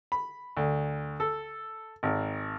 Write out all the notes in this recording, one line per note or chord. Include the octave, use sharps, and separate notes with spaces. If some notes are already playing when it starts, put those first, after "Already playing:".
B5
D2
A4
G#1